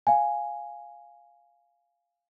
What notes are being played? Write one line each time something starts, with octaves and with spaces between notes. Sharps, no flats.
F5 G#5